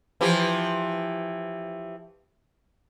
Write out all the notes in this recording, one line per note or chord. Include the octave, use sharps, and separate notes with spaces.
E3 F3 G4